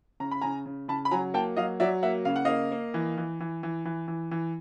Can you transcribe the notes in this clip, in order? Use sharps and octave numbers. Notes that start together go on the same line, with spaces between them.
C#3 A#5
B5
C#3 G#5 A#5
C#3
C#3 A5 B5
B5
F#3 G#5 A#5
A#3 G5 A5
F#3 D#5 F5
F#3 D5 E5
A#3 E5 F#5
C#3 F5
F#5
A#3 D#5 F5
A#3
E3
E3
E3
E3
E3
E3
E3